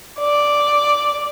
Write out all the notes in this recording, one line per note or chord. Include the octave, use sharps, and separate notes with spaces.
D5